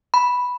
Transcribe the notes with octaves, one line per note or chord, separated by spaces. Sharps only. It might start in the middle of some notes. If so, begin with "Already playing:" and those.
B5